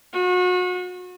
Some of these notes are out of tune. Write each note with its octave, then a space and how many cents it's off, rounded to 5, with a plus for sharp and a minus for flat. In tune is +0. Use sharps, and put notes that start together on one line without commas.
F#4 -35